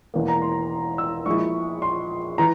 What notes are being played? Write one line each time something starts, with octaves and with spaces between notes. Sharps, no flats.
E1 E2 E3 A#3
A#5
C6
E6
A#1 A#2 G#3 E4 C#6
C6
E3 A#5